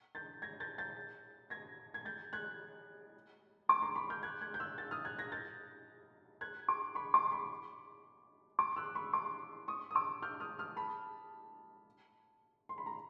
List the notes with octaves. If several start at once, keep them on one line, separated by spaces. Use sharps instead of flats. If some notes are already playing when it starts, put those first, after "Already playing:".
G6 A6
G#6 A#6
G6 A6
G6 A6
G#6 A#6
G#6
G6 A6
F#6 G#6
C6 D6
A#5 C6
B5 C#6
F6 G6
F#6 G#6
F#6 G#6
G6
E6 F#6
G6 A6
D#6 F6
F#6 G#6
G#6 A#6
G6 A6
F#6 G#6
C6 D6
B5 C#6
C6 D6
B5 C#6
C6 D6
E6 F#6
B5 C#6
C6 D6
C#6 D#6
D#6
D6 E6
F6 G6
D#6 F6
D#6 F6
A5 B5
C6
B5
A#5